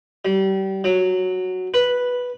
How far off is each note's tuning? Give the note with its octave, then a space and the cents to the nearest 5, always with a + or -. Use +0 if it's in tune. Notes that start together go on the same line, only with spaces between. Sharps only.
G3 -30
F#3 -5
B4 -5